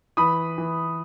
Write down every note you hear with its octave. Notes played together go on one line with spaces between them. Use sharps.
E3 B5 D#6
E3